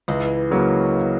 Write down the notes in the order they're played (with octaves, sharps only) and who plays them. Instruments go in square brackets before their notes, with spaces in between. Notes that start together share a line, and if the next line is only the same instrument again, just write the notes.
[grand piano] C#2 [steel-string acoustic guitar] E3 G#3
[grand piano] C#3 F#3 A#3 C#4